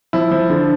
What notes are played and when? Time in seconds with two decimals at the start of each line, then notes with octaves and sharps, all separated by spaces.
0.13 F3 E4
0.31 F3
0.50 D3